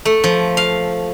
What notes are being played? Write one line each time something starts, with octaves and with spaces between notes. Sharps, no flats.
A3
F3
F5